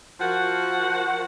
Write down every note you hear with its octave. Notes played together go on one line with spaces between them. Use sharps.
F3 F#4 A#4 F#5